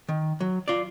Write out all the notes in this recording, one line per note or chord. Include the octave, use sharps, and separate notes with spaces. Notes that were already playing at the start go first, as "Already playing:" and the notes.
D#3
F#3
F4 D5